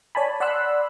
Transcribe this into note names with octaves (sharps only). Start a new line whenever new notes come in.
C#5 D5 G#5 A5 B5
D5 F#5 B5 C6 E6 F#6